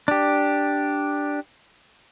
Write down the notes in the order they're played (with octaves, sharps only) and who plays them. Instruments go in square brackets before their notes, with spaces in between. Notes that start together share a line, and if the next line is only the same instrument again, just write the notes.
[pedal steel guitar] D4 G4